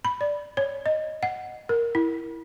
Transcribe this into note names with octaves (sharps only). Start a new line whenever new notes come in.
B5
D5
C#5
D#5
F#5
A#4
E4